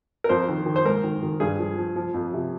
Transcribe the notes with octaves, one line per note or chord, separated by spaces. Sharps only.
A#4
F2 C5
D#3
D#3
C5
G#2 A#4
D#3
D#3
G2 G#4
F3
F3
F3
F2
C3